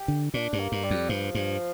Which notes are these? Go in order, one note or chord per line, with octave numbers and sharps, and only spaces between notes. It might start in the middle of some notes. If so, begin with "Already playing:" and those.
Already playing: G4
D3
A#2 D4
G2
A#3
G2
G3
F2
G2 F3
G2